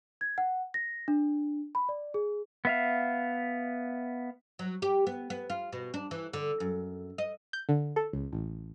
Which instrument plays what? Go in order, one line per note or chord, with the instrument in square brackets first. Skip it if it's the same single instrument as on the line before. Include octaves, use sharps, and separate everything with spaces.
[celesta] G#6
F#5
A#6
D4
B5
D5
G#4
[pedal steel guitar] B3 E5 F5
[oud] F#3
G4
B3
B3
F4
B2
D4
E3
D3
F#2
D#5
[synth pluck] G6
D3
A4
C#2
A1